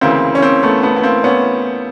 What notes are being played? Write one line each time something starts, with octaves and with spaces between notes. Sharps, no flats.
D2 C#3 E3 A#3 C4
C#4
A#3 C4
A3 B3
A3 B3
B3
A#3 C4
B3 C#4